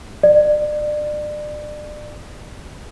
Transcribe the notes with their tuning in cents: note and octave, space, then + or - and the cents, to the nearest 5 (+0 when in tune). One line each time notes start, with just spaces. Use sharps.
D5 +30